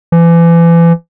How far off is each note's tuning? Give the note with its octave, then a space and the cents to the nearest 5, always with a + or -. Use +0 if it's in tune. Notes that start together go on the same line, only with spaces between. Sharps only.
E3 +35